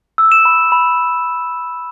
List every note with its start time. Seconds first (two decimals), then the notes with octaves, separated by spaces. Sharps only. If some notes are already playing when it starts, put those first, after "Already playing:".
0.18 E6
0.32 E7
0.45 B5
0.72 B5